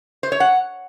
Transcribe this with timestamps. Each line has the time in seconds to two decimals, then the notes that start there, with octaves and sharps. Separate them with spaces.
0.23 C5
0.32 C#5
0.40 F#5